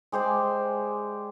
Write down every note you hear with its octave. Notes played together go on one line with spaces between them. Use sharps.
G#3 G4 C5 D5